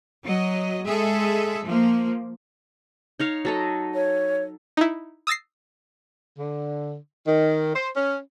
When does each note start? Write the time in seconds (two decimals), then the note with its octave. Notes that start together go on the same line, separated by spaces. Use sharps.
0.25 F#3 D#5
0.86 G#3 G#4 A4 E5
1.65 F3 A#3
3.20 D#4 C#5 F5
3.45 F#3 A4 D#5
3.95 C#5
4.77 D#4 E4
5.27 D#6 E6 A6 A#6 C7
6.38 D3
7.27 D#3
7.75 C5
7.96 C#4